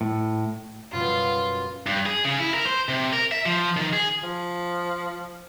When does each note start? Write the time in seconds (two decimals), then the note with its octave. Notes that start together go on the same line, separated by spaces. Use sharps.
0.01 A2
0.92 F#2 B2 G3 F4
1.87 G2
2.06 G#4
2.25 C#3
2.39 E4
2.54 A#4
2.66 C5
2.89 C3
3.13 A#4
3.32 E5
3.46 F3
3.76 D#3
3.93 G#4
4.23 F3